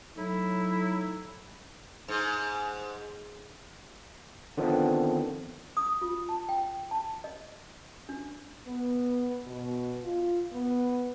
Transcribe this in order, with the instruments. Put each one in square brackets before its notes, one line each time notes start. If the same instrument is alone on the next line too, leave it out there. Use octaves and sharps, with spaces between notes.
[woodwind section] A2 F#3 D#4 E4
[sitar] G#2
[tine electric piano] D3 D#3 F3 B3 C4 D4
[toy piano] D#6
F4
A5
G5
A5
D#5
D4
[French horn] B3
B2
F4
B3